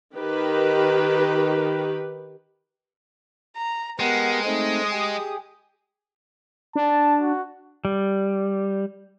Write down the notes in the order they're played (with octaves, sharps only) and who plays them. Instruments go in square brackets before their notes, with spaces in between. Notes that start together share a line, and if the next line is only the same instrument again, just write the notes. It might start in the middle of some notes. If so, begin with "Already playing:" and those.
[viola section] D#3 G4 B4
[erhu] A#5
[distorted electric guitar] G#3 [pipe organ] B3 G4 A#4 [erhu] F#5
[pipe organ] A3 C4 D#4 [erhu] D#6
[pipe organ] G4 G#4
[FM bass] D4 [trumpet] A5
[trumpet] F#4
[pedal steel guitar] G3